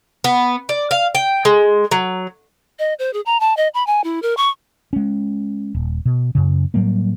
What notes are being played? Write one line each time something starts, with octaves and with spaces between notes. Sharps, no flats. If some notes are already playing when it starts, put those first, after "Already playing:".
B3
D5
F5
G5
G#3
F#3
D#5
C5
G#4
A#5
A5
D#5
B5
G#5
E4
A#4
C#6
G#3 C#4
D#1
B2
F#2 C#3
A2 F#3 G3 A#3